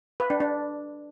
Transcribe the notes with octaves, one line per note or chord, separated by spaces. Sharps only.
B4
D4
D4